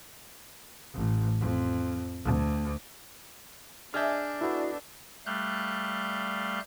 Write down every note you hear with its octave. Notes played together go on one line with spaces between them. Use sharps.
A1
F2
D2
D4 G#4 D#5 E5 G#5 E6 F6 G6
A3 B3 E4 F#4
G3 A3 F5 F#6 G6